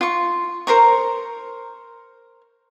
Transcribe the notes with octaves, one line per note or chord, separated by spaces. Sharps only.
F4 C#6
A#4 C5 A#5 C#6